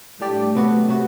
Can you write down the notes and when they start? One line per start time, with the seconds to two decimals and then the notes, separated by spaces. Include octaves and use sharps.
0.20 A2 G3 A3 D4 G4 D5
0.55 C3 F#3 B3 F#4
0.88 C3 F#3 B3 F#4